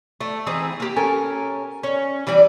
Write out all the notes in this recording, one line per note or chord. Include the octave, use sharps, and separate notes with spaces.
A3
E3 C4 D#4 G#4
A#3 G4
C#4 A4 A#4 G#5
C#4
E3 G3 D5 G#5